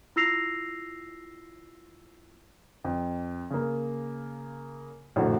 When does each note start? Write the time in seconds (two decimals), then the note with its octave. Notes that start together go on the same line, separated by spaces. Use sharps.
0.16 E4 F4 E6 A#6 C7 F7
2.84 F2
3.51 C#3 A#3
5.16 A#1 F#2 A2 D3 E3 F#4